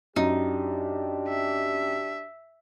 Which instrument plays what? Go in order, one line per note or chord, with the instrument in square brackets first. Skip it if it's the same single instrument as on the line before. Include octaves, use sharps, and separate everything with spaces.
[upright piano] F#2 [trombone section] D4 G4 [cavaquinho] D#4
[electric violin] E5